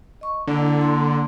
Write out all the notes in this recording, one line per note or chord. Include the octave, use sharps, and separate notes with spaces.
D#5 C#6
D3 A#3 E4 D5
A#3 C6